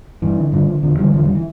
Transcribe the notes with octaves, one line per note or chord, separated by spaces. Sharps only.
G2 E3
D3
G2 D3 F3
D3
E2 D3 F3
D3 E3 G3
E2 D3 F3
E3 G3
D3
E3